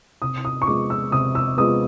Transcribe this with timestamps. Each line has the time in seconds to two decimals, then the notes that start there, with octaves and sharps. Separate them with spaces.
0.22 C3 D#6
0.45 D#6
0.62 C#6
0.67 F3 G#3 B3 D6
0.90 E6
1.12 C3 D#6
1.35 E6
1.58 F3 G#3 B3 D#6